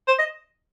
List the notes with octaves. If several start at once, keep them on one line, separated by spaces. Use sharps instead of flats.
C5
D#5